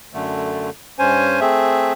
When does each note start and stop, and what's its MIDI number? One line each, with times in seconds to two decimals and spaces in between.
0.14 0.70 42
0.14 0.70 50
0.14 0.70 57
0.99 1.40 43
0.99 1.40 61
0.99 1.40 72
0.99 1.40 80
1.41 1.93 57
1.41 1.93 60
1.41 1.93 68
1.41 1.93 76